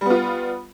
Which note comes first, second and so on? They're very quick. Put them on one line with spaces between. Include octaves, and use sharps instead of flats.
G3 B3 F4